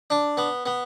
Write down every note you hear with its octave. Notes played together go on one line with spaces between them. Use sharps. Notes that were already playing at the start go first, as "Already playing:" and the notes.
D4
B3
B3